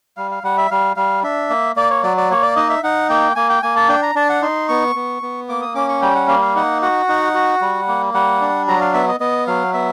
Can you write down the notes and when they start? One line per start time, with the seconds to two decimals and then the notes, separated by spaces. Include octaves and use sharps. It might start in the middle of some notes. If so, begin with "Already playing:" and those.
0.17 G3 F5
0.31 F5
0.43 G3 F#5
0.58 E5
0.71 G3 F5
0.97 G3 F5
1.23 D4 E5
1.50 A#3
1.76 A#3 D5
1.90 C#5
2.03 F#3 D5
2.17 D5
2.31 A#3 C#5
2.43 D5
2.56 D#4 D#5
2.69 E5
2.83 D#4 F#5
3.10 A#3 G5
3.36 A#3 G#5
3.49 G5
3.63 A#3 G#5
3.76 A5
3.89 D4 G5
4.03 A#5
4.15 D4 A5
4.30 F#5
4.42 D#4 C6
4.69 B3 C#6
4.95 B3
5.23 B3
5.49 A#3 D6
5.61 D#6
5.75 C#4 D6
5.89 C#6
6.02 G3 G5
6.15 F#5
6.28 A#3 F5
6.42 F5
6.56 D#4 F#5
6.82 F#4 F#5
7.09 D#4
7.34 F#4
7.61 G3
7.88 A#3
8.14 G3 F#5
8.41 D4
8.68 F#3 A#5
8.81 F5
8.94 B3 E5
9.08 D#5
9.20 B3 D#5
9.47 F#3 F5
9.73 B3 E5